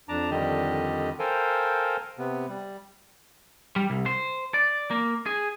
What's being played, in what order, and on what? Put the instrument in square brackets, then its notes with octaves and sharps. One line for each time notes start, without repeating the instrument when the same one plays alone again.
[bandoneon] F2 D4 A5 A#5 D6
F2 D3 D#3 G3 G4 D#5
A4 A#4 C5 F5 G5 G#5
C3 B3
G3
[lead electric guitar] G3
C2
C5
D5
A#3
G#4